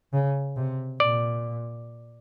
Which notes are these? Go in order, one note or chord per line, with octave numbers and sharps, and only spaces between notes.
C#3
C3
A#2 D5